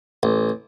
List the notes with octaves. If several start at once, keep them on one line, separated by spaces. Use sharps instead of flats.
A1